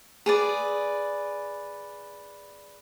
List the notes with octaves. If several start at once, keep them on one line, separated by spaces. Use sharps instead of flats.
G#4 B4 D5